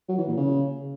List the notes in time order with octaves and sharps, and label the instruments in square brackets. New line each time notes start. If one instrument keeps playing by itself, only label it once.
[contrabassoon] F#3
E3
A#2
C#3